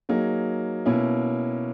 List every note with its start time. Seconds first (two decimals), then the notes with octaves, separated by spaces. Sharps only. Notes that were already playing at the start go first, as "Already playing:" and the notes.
0.09 F#3 A#3 D#4 G#4
0.86 B2 A#3 C#4 E4